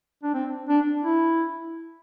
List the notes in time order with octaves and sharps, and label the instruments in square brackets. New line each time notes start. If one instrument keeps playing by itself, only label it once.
[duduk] D4
C4
D4
E4